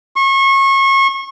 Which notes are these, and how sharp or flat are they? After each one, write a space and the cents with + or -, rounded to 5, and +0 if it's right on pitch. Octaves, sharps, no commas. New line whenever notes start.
C#6 -30